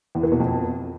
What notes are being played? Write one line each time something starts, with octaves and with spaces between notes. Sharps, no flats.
E2
E3
B2
F2